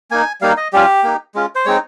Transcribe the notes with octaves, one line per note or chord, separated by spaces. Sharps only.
A#3 D#4 G#5
G3 A#3 D#4 F5
D#5
G3 C#4 F4 G4
A#3 D#4
G#3 C#4 F4
C5
G#3 C4 D#4 C#5